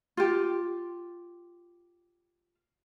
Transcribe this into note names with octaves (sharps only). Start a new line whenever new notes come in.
F4 G4